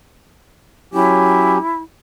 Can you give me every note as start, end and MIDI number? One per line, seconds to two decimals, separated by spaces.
0.94 1.58 54
0.94 1.58 61
0.94 1.82 64
0.94 1.58 67